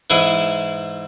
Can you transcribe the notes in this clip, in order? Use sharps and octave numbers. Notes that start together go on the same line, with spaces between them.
G#2 E3 E4 G#4